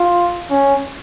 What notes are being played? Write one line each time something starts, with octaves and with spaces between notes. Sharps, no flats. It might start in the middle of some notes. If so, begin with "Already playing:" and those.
Already playing: F4
C#4